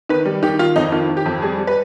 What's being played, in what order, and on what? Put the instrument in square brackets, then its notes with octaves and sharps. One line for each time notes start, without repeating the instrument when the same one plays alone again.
[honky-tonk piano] D#3 B4
G3
D#3 G4
D#3 F4
F2 D#4
D#3 F4
D#3
G4
F2
G3 G#4
G3
B4